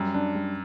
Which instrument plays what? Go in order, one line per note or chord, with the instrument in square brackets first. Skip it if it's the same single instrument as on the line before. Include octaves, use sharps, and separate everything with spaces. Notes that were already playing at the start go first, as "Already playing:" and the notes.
Already playing: [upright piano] F#2 [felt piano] G3
[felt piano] D4
G3